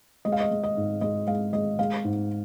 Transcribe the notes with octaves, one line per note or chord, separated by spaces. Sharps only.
G#3 D#5
F5
D#5
G#3
D#5
G#2
G#3 D#5
G#3 F5
G#3 D#5
G#3 F5
G#2